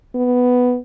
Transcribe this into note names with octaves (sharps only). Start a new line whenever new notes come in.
B3